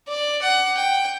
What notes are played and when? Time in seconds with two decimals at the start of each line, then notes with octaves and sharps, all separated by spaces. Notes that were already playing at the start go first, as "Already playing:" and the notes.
0.08 D5
0.42 F#5
0.77 G5